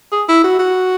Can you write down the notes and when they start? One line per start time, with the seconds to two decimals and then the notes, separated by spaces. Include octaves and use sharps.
0.12 G#4
0.28 E4
0.44 F#4
0.59 F#4